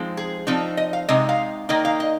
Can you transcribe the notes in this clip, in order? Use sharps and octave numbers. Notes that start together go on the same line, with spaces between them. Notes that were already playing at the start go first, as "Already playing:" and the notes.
Already playing: F3 G#3 C4 D#4
G#4
F3 C4 D#4
D#5
F5
C3 G#3 D#4 D#5
F5
D#3 A#3 D#4 D#5
F5
D#5